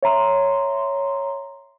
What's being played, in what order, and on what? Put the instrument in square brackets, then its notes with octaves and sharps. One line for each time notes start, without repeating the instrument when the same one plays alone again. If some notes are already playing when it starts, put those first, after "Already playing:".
[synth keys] C#5 E5 A#5 C6